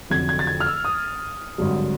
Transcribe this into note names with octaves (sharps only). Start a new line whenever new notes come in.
F1 F2 D3 F#3 G#6
G#6
A6
G#6
F6
E6
D#6
G#1 G2 D3 F#3